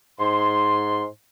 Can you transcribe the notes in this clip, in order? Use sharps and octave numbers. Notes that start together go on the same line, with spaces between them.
G#2 C6